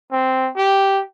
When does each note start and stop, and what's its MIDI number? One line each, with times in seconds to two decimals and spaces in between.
0.12 0.49 60
0.56 1.02 67